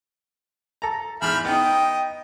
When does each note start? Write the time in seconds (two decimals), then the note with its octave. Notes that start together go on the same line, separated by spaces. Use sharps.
0.82 A4 A#5
1.22 E2 G#2 E5 B5 F6 G6
1.45 B3 D#4 D#5 G5